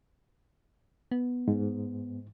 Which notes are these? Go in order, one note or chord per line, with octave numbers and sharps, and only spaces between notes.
B3
G#2